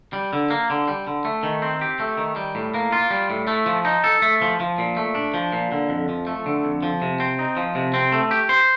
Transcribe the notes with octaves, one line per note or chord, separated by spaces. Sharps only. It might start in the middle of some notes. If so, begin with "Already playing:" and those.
G3
D3
A#3
D3
G3
D3
A3
D#3
C4
G4
A3
D#3
G3
A2
A#3
F4
G3
A2
A3
F3
D#4
A4
A3
F3
F3
A#2
A3
D4
F3
A#2
D3
F2
F3
A3
D3
F2
F3
C3
C4
D#4
F3
C3
C4
A3
G4
C5